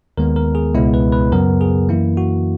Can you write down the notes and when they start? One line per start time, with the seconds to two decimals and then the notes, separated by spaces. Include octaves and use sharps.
0.17 D#2 D#3 G#3 B3 A#4
0.36 A#4
0.55 G#4
0.74 C#2 B2 G#3 B3 E4
0.94 B4
1.12 B4
1.32 F#2 C#3 F#3 B3 A#4
1.61 G#4
1.89 F#2 E3 A#3 E4
2.17 F#4